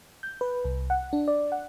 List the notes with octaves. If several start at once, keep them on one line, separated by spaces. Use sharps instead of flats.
G6
B4
C2
F#5
D4
D5
F#5